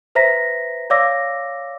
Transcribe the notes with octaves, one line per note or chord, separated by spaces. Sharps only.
B4 C5 E5 A#5 A#6 B6
C#5 D5 F5 D6 E6 A#6